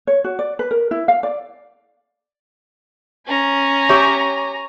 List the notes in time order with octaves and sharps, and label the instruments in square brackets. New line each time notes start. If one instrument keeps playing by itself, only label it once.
[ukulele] C#5
F#4
D5
B4
A#4
E4
F5
D5
[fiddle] C#4 [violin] G#5 A#5
[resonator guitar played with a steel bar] G4 E5 [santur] C#5